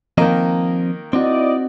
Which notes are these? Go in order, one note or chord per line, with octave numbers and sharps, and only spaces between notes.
D#3 F3 A#3 C4 D#5
C4 D#4 E4 F#4 D5 D#5